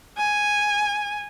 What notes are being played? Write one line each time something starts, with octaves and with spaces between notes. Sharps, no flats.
G#5